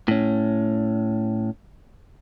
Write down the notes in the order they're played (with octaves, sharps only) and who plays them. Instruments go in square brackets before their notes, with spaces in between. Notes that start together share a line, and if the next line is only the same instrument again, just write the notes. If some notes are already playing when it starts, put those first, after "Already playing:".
[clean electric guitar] A2 C#4